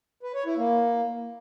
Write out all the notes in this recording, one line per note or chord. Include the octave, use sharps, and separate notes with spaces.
B4
C#5
E4
A#3